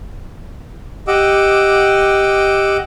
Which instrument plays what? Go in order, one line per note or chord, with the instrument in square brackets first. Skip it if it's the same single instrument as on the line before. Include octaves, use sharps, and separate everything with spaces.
[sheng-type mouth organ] G4 D#5 F#5 D6 E6